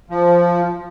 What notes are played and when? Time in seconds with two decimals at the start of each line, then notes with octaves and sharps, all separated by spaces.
0.10 F3